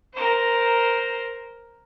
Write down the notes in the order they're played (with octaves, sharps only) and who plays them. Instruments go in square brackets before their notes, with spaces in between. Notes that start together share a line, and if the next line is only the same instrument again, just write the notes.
[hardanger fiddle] A#4 C5